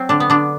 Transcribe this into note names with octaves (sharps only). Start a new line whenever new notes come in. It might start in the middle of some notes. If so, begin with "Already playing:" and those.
Already playing: F#3 C4
D3 D4
B3
D3 D4